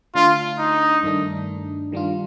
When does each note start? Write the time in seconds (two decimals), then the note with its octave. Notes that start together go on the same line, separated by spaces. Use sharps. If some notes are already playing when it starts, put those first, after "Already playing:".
0.15 D3 A3 D4 F4
0.59 D#4
1.03 G2 D#3 A3 D4
1.92 D#3 G3 D4 F4